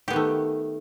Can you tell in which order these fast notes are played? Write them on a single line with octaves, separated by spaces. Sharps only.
G4 B3 D#3 A3